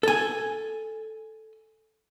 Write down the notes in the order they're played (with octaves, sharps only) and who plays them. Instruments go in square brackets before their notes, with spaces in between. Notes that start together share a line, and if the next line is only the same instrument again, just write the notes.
[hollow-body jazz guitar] A4 G#5